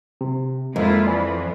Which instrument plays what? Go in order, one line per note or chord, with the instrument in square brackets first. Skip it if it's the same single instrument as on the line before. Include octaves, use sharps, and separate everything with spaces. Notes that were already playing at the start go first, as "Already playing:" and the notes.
[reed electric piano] C3
[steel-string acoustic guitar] F2 [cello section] G#3 E4 F4 [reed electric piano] A#3
[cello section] E3 F3 [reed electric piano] D5 G#5 B5